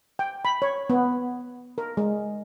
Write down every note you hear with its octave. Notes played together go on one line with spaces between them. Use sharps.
G5
B5
C#5
B3
A#4
G#3